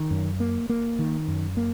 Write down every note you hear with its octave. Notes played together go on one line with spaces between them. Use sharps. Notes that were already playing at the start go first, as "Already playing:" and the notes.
Already playing: D#3
F#2
A#3
A#3
D#3
F#2
A#3